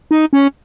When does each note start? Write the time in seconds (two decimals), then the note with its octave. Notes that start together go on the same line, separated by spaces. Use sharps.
0.11 D#4
0.33 C#4